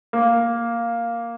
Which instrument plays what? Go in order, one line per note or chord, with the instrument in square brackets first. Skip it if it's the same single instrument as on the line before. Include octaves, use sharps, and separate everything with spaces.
[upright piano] A#3